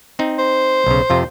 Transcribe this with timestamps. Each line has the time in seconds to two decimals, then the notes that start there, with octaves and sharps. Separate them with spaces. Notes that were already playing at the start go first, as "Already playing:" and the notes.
0.19 C4 D#4
0.39 C5
0.87 B1 C#3
1.10 F2 C3 F4